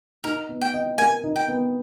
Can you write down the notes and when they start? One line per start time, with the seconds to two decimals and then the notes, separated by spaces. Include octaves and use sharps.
0.24 D#4 A#4
0.49 B3
0.61 G5
0.74 D#5
0.98 A#4 G#5
1.24 D#4
1.36 G5
1.48 B3